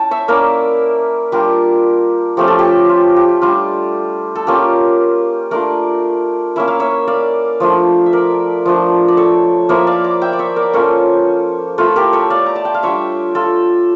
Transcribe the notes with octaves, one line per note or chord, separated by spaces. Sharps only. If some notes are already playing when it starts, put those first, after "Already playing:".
Already playing: C#4 E4 G5 A5
C#5 E5
A#3 C#4 E4 A#4 D5
G3 D4 F4 G4 A#4
F3 A3 C#4 G4
A4
G4
F4
G4
G3 D4 F4
A4
A#3 C#4 F4 G4
A3 D4 F4 A#4 D5
A#3 C#4 E4 E5
F5
C#5 E5
D5 F5
F3 A3 D4 F4
E5
A#4 D5
F3 A3 D4
D5
A4 C#5
F3 A#3 E4 C#5 E5
D5 F5
A#5 D6
E5 G5
D5
C#5 E5
A#4 D5
A#3 C#4 F4 A4 C#5
A3 E4 F4 A4
G4 A#4
A4 C#5
D5 F5
A#5
A5
G5
F5
G3 D4 F4 C#5 E5
F4 A4